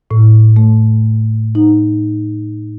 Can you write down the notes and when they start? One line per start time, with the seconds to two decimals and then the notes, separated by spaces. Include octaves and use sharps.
0.11 A2
0.56 A3
1.55 D#4